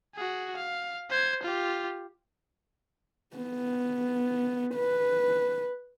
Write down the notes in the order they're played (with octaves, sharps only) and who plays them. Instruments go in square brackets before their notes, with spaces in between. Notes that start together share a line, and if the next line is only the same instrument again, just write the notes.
[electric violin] F#4 G#4
F5
C5 G#6
F4 G4
[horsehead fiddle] B3
B4